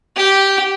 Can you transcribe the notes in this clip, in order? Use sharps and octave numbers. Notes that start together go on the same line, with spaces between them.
G4